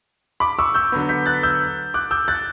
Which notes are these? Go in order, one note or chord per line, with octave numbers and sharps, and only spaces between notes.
B5 D6
C#6 E6
E6 G6
D3 F#3 B3
G6 B6
F#6 A6
E6 G6
D6 F#6
E6 G6
F#6 A6